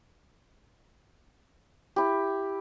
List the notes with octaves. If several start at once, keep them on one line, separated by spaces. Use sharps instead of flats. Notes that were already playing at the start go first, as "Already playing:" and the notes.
E4 G4